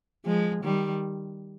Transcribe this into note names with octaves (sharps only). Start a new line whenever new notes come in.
F3 G#3
D#3 G3